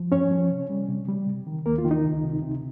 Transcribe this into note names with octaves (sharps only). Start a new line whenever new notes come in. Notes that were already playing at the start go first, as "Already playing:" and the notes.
Already playing: F3
G2 C#4 C#5
F3
C3
G3
C3
G3
C3
D#3
D#2 A#3 A#4
F4
D#3
D#4
C#2
C3
C3